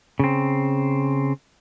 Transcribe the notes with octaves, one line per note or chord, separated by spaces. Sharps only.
C#3 C4